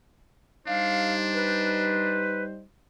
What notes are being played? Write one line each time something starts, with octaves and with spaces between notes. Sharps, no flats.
G3 D4 D#4 C5 F5
B4